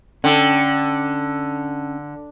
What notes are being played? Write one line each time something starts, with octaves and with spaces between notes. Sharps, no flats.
D3 C#4 G5 A5